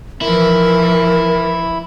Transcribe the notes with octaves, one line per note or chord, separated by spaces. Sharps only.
E3 F3 E4 A#4